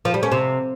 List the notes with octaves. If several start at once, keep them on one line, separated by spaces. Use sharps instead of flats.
F3
G3
C#4
C3